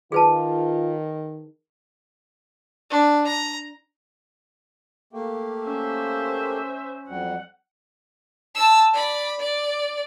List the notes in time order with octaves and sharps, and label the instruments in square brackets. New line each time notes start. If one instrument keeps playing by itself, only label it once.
[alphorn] D#3 [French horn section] F4 [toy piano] G#4 B4 A5
[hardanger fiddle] D4
A#5
[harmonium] A3 A#3 G4
[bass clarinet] C#4 [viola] C5 E5
[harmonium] F2 F#3 G3 [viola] F#5
[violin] A5 E6
D5 B5
D5